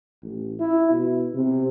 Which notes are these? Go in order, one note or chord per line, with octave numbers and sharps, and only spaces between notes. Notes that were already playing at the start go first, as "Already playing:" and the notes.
A1
E4
B2
C3